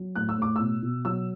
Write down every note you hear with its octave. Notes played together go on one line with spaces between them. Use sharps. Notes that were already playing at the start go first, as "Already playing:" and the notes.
Already playing: F#3
A2 F#6
E6
A2 D6
B2 E6
B2
F#3 E6